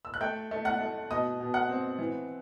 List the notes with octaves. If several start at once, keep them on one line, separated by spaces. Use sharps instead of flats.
E6
F#6
A3 G5 G6
A3
F#5 F#6
A3
B2 D#5 D#6
B2
F#5 F#6
C4
E3